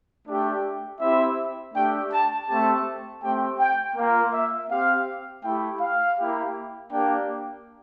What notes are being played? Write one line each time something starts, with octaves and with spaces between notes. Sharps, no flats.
A3 D4 G4
C4 E4 G4 E5
A3 D4 G4 G5
A5
A3 C4 G4 A5
A3 C4 G4 G5
G5
A#3 F4
E5
C4 G4 F5
A3 E4 G4 G5
F5
A#3 E4 G4
A#3 D4 G4 G5